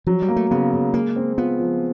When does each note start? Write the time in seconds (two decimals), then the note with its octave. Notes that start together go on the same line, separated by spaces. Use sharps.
0.07 F3 F#3
0.22 G3
0.28 A#3
0.36 A3
0.51 C#3 B3
0.73 C#3
0.94 G#3 A#3
1.16 C4
1.38 B3 F4
1.60 F3